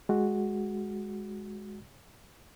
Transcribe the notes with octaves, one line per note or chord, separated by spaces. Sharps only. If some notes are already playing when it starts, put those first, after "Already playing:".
G#3 F#4